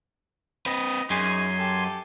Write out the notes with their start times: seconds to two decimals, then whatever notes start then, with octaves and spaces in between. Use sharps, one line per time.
0.66 C4 B4 D#5
1.10 F#2 D#4 G#4 G#5 C6
1.59 G4 A4